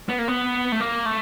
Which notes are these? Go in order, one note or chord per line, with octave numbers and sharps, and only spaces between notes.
B3
A#3
B3
A3
A#3
A3